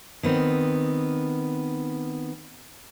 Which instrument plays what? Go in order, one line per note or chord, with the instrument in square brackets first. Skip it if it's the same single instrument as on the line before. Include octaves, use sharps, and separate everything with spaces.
[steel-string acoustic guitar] D#3 B3 C4